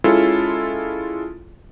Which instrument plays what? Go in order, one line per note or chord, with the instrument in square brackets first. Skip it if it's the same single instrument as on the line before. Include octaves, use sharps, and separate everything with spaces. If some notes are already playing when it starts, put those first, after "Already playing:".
[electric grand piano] G#3 C#4 E4 F4 A4